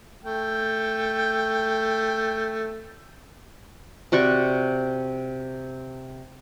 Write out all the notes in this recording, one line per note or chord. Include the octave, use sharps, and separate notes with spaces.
A3 G5
C3 F#4 D5 C#6